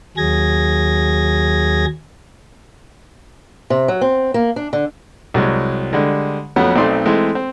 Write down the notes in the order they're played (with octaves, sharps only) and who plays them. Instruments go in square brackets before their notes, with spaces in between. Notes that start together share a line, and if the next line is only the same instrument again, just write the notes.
[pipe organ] D#2 F#3 G#4 G#6 A#6
[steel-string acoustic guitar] C3
F#3
C4
A#3
D4
D3
[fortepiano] C2 F#3 G#3
D3 G3 G#3
F2 F#3 A3 B3 C#4
B1 A3 C4 D#4 D5 C6
E3 G#3 A3 C4
C4